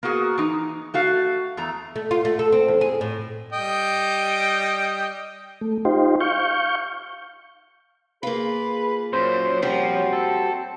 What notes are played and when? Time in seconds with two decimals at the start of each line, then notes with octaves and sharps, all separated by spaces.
0.03 A#3 B3 F#4 G#4
0.38 E3 D#4
0.94 A3 F#4 F5
1.57 E2 A3 A#5
1.96 A3
2.11 F4
2.25 A3
2.39 A4
2.52 C4
2.68 E2
2.81 G#4
3.01 A2
3.53 G3 D#5 G5
5.61 A3
5.85 D#4 F4 G4 C5
6.20 F5 C#6 G6
8.23 A#3 F4 G#4 B4
9.13 F#2 A#2 C5 C#5
9.62 F3 G3 C4 F#4
10.13 A4